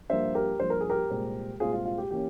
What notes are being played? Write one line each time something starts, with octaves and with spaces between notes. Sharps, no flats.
G2 F3 A#3 C5 E5
G4 A#4
G2 F3 A#3 C5
A#4
G#4
G4 A#4
C2 A#2 G#3 C4
C2 A#2 G#3 C4 F4 G#4
F4
F4
G4
E3 A#3 C#4 G4